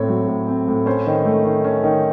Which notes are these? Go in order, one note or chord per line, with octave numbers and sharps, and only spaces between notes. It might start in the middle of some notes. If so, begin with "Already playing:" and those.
Already playing: A2 C4 C#5
F#3
A2
C4
A2
C#4 C5
D#3
A3
D#3
C#4
D#3